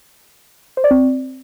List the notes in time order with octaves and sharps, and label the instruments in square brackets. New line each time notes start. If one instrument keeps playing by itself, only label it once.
[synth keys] C5
D5
C4